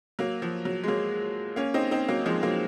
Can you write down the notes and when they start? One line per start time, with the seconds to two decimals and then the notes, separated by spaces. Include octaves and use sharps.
0.19 F#3 A#3
0.42 F3
0.65 F#3
0.83 G#3
0.88 F#3 A#3
1.56 A#3 C#4
1.74 C4 D#4
1.91 C4 D#4
2.08 F#3 A#3
2.25 F3 G#3
2.43 F#3 A#3